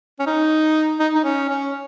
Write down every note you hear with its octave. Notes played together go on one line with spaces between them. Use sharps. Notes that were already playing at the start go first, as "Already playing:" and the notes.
C#4
D#4
D#4
D#4
C#4
C#4